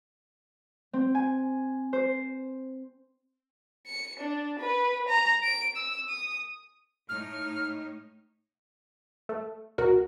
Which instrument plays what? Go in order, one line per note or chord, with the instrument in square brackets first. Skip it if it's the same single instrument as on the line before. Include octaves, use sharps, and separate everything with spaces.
[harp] C4
G#5
C5
[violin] C#7
D4
B4
A#5
D7
E6
D#6
[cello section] A2 D#4 C#5 [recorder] F6
[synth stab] A3
[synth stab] C#2 B2 A#4 [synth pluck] F#4